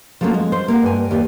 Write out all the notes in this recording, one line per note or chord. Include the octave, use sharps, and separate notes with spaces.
F3 G3 A3 A#3 C#4 F#4
G#3
C5
A#3 G4 A#4 F#5
G2 G#5
D#2 G4 D5